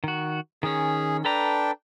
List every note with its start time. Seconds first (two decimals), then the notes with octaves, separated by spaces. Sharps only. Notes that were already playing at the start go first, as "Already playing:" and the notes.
0.04 D#3 F#4
0.63 D#3 C#4 G#4
1.25 D4 A4 B4 G5 A#5